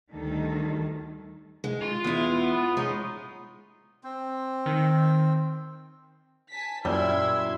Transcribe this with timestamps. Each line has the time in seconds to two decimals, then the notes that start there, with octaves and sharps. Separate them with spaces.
0.12 D2 D#3 G3 A4
1.64 G#3
1.81 F4 C6
2.04 E2 G#3 E4
2.42 B3
2.77 G#3 C#4 D#4
4.04 C4
4.66 D#3
6.50 G#5 A5 B6
6.85 F#2 A#2 G3 E4 C6 E6 G#6